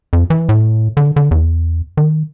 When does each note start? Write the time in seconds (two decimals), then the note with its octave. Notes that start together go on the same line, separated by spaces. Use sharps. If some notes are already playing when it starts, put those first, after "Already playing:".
0.13 F2
0.30 E3
0.49 A2
0.97 D3
1.16 D3
1.31 E2
1.97 D#3